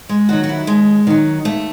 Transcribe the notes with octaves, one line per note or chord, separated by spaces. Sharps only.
G#3
D#3 F#3 F#4
F#4
E4
D#2 G#3
D#3 F#3
D#2 A3